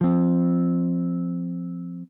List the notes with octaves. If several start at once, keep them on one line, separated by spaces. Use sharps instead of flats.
F3 C4